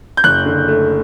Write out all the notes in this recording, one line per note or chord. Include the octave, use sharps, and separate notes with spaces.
G6
F#1 F#6
D3
A3